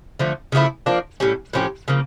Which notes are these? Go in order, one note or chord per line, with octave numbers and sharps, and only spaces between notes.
D3 F3 A3
C#3 F3 A3 E4
F3 A#3 D4
A2 G3 C#4
A2 F3 C#4 G4
C#3 F3 A#3